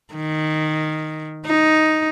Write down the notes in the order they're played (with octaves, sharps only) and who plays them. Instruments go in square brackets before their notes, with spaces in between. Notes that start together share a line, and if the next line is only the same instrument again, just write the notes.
[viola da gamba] D#3
D#4